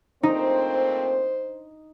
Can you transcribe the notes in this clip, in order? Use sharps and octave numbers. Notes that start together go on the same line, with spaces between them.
A#2 A3 C4 D#4 C5